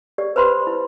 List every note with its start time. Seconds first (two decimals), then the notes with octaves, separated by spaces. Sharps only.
0.18 G4 D5
0.36 B4 C5 B5 C6
0.67 E4